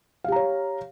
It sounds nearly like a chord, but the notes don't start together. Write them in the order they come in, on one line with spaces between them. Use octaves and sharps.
F5 G4 A#5 C#5